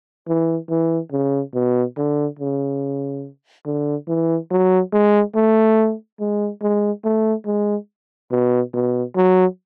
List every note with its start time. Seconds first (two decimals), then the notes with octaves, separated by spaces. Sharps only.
0.28 E3
0.69 E3
1.12 C#3
1.54 B2
1.97 D3
2.39 C#3
3.66 D3
4.08 E3
4.51 F#3
4.93 G#3
5.35 A3
6.20 G#3
6.62 G#3
7.04 A3
7.46 G#3
8.31 B2
8.74 B2
9.16 F#3